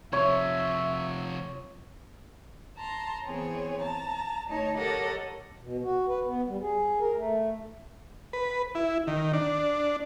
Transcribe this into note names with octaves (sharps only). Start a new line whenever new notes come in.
C3 F3 C#5 E5
A5 A#5 C6
E3 B3 C4 G#4 C#5
A5 A#5
D2 D#4 C#5 A5
G4 A4 A#4 C#5 D#5 F#5
B2
F#4
B4
B3
G3
G#4
A#4
A3
B4
E4
D#3
D4